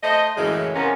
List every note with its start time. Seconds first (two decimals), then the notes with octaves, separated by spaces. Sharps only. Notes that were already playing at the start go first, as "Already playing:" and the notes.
0.03 A3 C5 D#5
0.37 F#2 A2 C#3 E3 G#3
0.75 C3 F3 B3 C#4 A#4